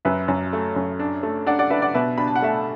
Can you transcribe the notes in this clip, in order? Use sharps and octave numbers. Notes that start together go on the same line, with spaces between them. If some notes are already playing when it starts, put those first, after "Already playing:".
F#2 B4 E5
F#2
A3
F#2
D4
A3
D4 D5 F#5
D5 F#5
D4 B4 E5
D5 F#5
B2 B4 E5
D4 B5
A5
F#5
A3 E5 A5